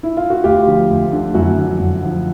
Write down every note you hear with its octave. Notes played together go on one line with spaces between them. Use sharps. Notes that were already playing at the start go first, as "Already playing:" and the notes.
E4
F4
F#4
D2 F4 G4
D3 F3
D2
D3 F3
F#2 E4 F#4
D3 F3
F#2
D3 F3